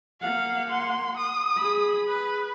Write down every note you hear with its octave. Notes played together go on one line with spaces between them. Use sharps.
A#3 F5 F#5
C6
D#6
G#4 B5
B4